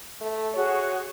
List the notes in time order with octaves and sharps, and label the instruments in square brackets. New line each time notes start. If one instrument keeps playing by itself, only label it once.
[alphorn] A3
[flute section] F#4 G#4 [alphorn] C#5